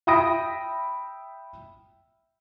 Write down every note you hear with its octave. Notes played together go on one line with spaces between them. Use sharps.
E5 G5 B5 D#6 A#6 D7